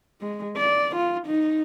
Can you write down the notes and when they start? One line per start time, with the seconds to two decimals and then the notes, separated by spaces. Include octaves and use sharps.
0.21 G#3
0.57 D5
0.96 F4
1.26 D#4